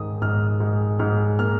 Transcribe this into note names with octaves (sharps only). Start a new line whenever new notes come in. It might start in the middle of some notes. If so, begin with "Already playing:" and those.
Already playing: G#2 D#3 D#6
G#2 F6
G#2
G#2 F6
A#3 F6